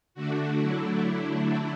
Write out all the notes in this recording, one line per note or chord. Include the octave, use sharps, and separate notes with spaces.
D3 A3 D4 F#4
D3 F#3 A3 D4 E4